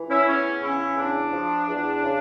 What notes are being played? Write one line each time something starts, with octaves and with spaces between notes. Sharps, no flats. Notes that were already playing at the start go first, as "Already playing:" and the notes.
Already playing: E3
C#4 E4
E2 C#4
C#3 C#4 E4
E2 D4
F3
E2
C#3